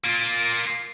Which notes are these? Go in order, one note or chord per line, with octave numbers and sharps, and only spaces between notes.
A#3 F4